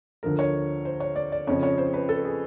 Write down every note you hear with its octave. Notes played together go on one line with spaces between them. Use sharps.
D2 D3 F3 A#4
C#5
C5
C#5
D5
D5
F2 C#3 F3 C#5
C#5
C5
B4
A4
G#4